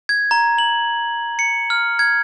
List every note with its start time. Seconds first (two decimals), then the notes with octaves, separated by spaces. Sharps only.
0.09 G#6
0.31 A#5
0.58 F#7
1.39 C#7
1.70 F6
1.99 G#6